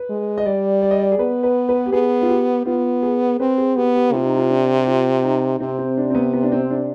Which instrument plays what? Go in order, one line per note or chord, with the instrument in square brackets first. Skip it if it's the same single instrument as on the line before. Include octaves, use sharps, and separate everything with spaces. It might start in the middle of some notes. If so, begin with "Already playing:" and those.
Already playing: [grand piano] B4
[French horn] G#3
[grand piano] D#5
[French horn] G3 [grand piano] D5
[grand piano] D5
D#5
D5
G#4
[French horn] B3 [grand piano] B4
[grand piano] B4
B4
G4
[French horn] B3 [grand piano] G#4
[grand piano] F4
G4
[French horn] B3 [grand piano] F4
[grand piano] G#4
[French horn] C4 [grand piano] B4
[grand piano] G#4
[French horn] B3 [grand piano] G4
[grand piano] G4
[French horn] C3 [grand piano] F4
[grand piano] D#4
F4
D4
G4
F4
D#4
[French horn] C3 [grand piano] C4
[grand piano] C4
D4
C4
B3
B3
D4
C4
D4